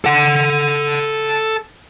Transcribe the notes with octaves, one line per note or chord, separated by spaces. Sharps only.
A4 F#5